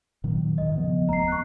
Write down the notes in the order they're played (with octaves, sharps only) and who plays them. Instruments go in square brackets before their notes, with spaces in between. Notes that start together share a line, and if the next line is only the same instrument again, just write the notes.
[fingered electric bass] A#2 D#3 F#3
[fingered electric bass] D#2 G#2 D#3 [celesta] D#5
[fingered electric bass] C#3 F3 B3
[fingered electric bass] F1 D#2 A3 [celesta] A#5 C7
[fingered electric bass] B3 [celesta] C#6 F#6